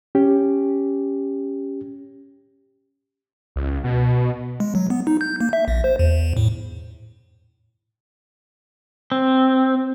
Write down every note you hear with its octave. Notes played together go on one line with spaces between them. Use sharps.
C#4 G4
C#2
B2
G#3
F#3
B3
D#4
G6
A#3
E5
A#1
C5
E2
A2
C4